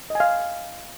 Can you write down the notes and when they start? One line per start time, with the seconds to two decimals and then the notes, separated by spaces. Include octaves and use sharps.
0.10 D#5
0.15 G#5
0.20 F5